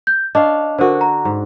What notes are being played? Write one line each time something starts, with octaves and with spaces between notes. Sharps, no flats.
G6
D4 C#5 D#5 F5
D3 F#4 A#4 C5
A#5
G#2